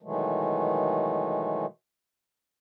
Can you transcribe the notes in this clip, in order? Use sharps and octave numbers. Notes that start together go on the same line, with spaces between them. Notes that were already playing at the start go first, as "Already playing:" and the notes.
B2 D#3 E3 F#3 G#3 A3